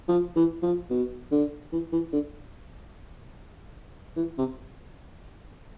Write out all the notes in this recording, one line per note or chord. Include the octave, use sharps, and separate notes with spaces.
F3
E3
F3
B2
D3
E3
E3
D3
E3
C3